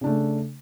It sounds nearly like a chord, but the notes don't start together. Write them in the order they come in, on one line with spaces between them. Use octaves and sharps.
C#3 D4 A3